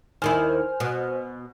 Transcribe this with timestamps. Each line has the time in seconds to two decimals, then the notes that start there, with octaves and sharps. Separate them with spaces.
0.22 D#2 D#3 E4 C5 G#5 F6
0.80 B2